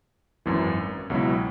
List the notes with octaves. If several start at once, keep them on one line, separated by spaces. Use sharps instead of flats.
G#1 F#2 E3
C#2 B2 F#3 B3 E4